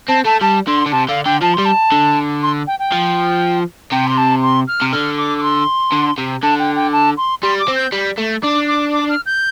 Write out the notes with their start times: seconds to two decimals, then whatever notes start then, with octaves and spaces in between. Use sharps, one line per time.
0.09 C4 A5
0.25 A3 A5
0.41 G3 A5
0.67 D3 C6
0.86 D3
0.92 C3 A5
1.09 D3 F5
1.25 D3 G5
1.42 F3 A5
1.54 G3 C6
1.65 A5
1.92 D3
2.43 C6
2.67 G5
2.79 G5
2.92 F3
3.92 C3 G5
4.07 C6
4.17 A5
4.43 C6
4.68 F6
4.81 C3
4.93 D3 F6
5.17 D6
5.38 D6
5.43 C6
5.92 D3
6.18 C3
6.43 D3 A5
6.59 G5
6.76 G5
6.92 A5
7.17 C6
7.42 G3 C6
7.59 D6
7.68 C4
7.76 G6
7.92 G3
8.18 A3
8.43 D4 D6
8.68 D6
8.93 D6
9.09 F6
9.26 G6